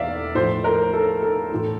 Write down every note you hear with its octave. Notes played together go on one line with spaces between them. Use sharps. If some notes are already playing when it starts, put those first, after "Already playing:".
Already playing: E2 D5 E5 F5
A2 F3 C5
A#4
A4
A4
A2 E3